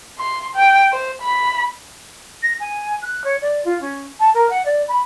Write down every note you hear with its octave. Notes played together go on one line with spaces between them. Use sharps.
C6
G5
C5
B5
A#6
G#5
F#6
C#5
D5
F4
C#4
A5
A#4
F#5
D5
B5